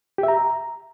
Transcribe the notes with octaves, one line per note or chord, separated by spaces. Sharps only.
G4
E5
A#5